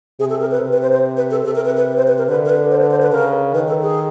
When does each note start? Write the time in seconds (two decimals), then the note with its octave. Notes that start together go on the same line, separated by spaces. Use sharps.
0.20 C3 G#4
0.30 A4
0.41 A#4
0.51 B4
0.61 C3
0.72 B4
0.82 C5
0.92 C5
1.17 B4
1.31 A4
1.45 C3 A4
1.55 A#4
1.65 B4
1.77 B4
1.97 C5
2.07 B4
2.18 A#4
2.28 D3 B4
2.45 A#4
2.50 B4
2.71 C5
2.81 B4
2.91 C5
3.02 B4
3.12 C#3 A#4
3.54 D#3 B4
3.68 A4
3.83 G#4